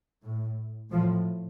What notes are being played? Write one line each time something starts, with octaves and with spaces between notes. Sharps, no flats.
A2
A2 F3